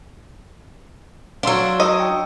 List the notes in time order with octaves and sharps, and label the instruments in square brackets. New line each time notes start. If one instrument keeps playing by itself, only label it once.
[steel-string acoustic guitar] F#3 D4 [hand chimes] F5 C6 E6
[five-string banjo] D#5 [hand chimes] E6
[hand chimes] G5